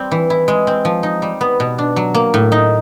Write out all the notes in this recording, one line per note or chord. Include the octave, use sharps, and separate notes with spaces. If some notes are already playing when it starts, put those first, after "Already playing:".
Already playing: G3 C4
E3
E4
G#3
C4
F3
D#4
G3
B3
B2
D4
F#3
A#3
A2
D#4